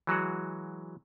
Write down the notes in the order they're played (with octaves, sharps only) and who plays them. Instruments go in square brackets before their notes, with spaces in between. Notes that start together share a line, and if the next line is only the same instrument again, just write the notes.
[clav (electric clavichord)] E3 F#3 G#3 F#4